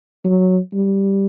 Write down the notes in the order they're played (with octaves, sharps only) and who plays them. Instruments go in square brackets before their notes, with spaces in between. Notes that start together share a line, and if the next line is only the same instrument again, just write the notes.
[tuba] F#3
G3